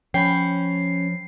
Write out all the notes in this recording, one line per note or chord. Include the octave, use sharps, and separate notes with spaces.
F3 C#4 G5 B5 C7